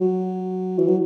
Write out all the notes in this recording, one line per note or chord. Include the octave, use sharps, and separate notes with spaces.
F#3
E3
F#3